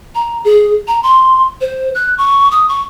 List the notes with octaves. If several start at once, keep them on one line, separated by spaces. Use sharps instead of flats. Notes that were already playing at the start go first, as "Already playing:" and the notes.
A#5
G#4
A#5
C6
C5
F#6
C#6
D#6
C#6